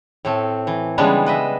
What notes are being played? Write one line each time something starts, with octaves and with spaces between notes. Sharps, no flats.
A2 A3 C4
E3
C#3 E3 G3 G#3 B3 D4
B4 D#5 E5